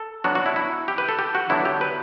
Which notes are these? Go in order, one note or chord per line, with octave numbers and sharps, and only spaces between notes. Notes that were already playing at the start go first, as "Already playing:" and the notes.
Already playing: A4
F#3 B3 D4 F#4
F#4
E4
E4
G4
B4
A4
G4
F#4
D3 F#3 B3 D4 E4
G4
B4